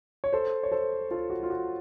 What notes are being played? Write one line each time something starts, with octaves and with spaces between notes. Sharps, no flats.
C#5
A4 C5
C#5
A4 C5
F4 A4
F#4
F4
F#4